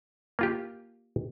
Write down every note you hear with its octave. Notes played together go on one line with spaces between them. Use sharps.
A#3 F4 G4